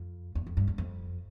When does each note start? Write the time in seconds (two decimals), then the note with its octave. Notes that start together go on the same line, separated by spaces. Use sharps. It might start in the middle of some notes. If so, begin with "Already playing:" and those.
Already playing: F2
0.35 E2
0.47 F2
0.57 G2
0.68 E2
0.78 F2